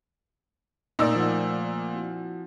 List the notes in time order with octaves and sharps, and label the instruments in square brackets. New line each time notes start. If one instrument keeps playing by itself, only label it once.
[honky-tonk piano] A#2 E6 [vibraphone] A3 A#4 [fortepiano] D#4 D5
[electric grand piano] F3 F#5
[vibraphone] C4 E4 F#4